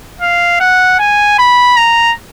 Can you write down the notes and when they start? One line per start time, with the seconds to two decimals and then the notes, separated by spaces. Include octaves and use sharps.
0.21 F5
0.61 F#5
0.99 G#5
1.39 B5
1.77 A#5